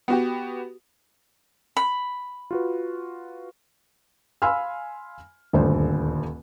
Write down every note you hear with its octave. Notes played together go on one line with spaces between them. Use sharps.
B3 F#4 G4
B5
F4 F#4 B4
F5 G#5 B5 C6 E6 F6
D#1 D2 G2 C5